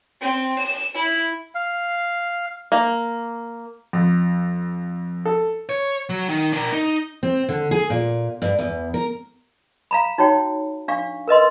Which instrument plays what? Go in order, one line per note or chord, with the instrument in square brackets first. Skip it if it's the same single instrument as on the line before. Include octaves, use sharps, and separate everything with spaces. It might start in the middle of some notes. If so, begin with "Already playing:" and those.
[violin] C4
E7
E4
[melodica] F5
[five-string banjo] A#3
[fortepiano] F2
A4
[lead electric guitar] C#5
F#3
D#3
D4 A#4
D#4
[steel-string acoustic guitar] C4
D3
G#4
A#2
G2
E2
A#4
[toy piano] F5 A#5 B5
D#4 F#4 C#5 G5
D4 F5 C#6
A#4 B4 D#5 C6